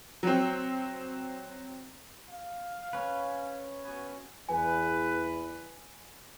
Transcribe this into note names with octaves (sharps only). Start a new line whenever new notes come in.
F#3 C4
F5
C#4 B4
B3 F#4 G#5
E2 B4 G#5